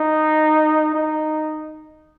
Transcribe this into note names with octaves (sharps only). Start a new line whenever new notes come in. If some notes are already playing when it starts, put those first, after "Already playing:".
Already playing: D#4
D#4